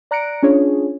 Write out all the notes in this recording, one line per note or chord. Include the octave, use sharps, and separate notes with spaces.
D5 A#5 F#6 A#6 C#7 D7
C#4 D4 F4 G#4 C#5